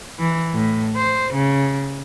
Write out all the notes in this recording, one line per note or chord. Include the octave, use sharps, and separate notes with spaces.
E3
A2
C5
C#3